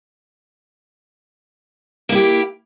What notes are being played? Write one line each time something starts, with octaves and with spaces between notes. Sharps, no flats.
A#3 E4 G4